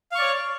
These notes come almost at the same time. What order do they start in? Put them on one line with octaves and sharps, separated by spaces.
F5 C#6 D5 C#5